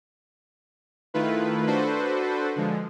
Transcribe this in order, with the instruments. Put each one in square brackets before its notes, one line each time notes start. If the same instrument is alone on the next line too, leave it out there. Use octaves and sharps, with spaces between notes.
[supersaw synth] D#3 A3 E4 F4 B4
D4 F#4 A4 B4 C5
D3 F3 G#3